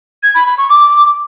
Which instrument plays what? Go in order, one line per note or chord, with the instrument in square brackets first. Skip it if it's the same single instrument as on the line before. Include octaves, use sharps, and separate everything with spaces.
[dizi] G#6
B5
B5
C#6
D6